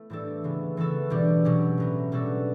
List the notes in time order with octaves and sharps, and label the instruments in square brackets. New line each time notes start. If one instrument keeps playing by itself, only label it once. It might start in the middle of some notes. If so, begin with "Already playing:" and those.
Already playing: [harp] A3 B3 E4
A2 E3 G3 D4 A4
C#3 E3 B3
E3 B3 F#4 A4
B2 G3 D4 G4
B2 F#3 C#4 G4
A2 F#3 B3
B2 G3 D4 F#4 A4